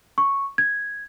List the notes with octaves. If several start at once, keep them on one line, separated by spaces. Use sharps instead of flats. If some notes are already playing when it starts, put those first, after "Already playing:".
C#6
G#6